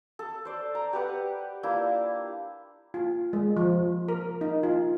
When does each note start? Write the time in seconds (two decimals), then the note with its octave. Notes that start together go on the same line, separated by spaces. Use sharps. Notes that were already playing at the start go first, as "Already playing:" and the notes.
0.19 A4
0.45 C5 D5
0.75 A#5
0.93 G4 B4 F#5
1.63 A#3 D4 E4 F4
2.94 F4
3.33 G#3
3.57 F3
4.09 A#4
4.41 D#4
4.63 F4